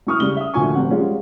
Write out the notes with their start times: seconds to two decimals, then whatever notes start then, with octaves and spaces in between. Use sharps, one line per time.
0.07 F#2 E4 C#6 D#6 F6
0.20 C#3 G3 G7
0.36 E5 D#6
0.54 D2 A#2 F3 G#5 C#6
0.74 F1 C3 C4 F#5
0.91 G3 G#3 C#4 F4